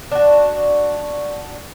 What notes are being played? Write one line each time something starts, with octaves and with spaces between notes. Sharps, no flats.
D4 F#4